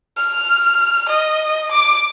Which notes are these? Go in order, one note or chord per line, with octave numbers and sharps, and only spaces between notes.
F6
D#5
D6